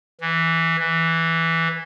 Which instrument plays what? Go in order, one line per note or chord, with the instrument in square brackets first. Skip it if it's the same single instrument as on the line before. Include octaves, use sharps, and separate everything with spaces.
[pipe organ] E3
E3